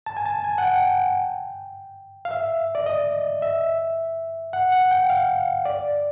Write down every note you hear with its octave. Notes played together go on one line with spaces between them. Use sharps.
A5
G#5
A5
G#5
F#5
G5
F5
E5
D5
D#5
E5
F#5
F#5
G5
F5
D5